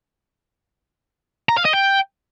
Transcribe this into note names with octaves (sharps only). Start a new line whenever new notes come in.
A#5
F5
D#5
G5